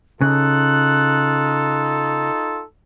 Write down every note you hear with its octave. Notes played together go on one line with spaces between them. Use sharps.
C#3 D#4 F4 A4 F#6